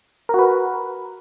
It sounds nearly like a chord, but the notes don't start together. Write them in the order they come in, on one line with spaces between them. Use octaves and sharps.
A#4 F#4 B4